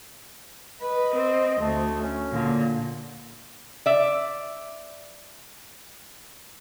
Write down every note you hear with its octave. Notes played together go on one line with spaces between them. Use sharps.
B4 D#5
C4
D2 A3
C#4
A#2 D3
D5 E5